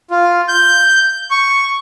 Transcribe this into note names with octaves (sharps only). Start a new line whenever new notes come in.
F4
G6
C#6